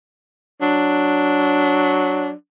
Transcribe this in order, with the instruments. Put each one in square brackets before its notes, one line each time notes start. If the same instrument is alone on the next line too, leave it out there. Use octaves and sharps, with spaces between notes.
[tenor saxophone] F#3 [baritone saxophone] D4